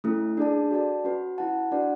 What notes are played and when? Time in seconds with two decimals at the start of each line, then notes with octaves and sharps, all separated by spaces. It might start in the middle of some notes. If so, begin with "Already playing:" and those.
0.04 A3 C#4 E4 A4
0.37 D4 G#4 D5 A5
0.71 F#4 A4 D5 A5
1.04 C#4 F#4 B4
1.38 E4 B4 F#5 A5
1.72 D4 F#4 B4 D5 F#5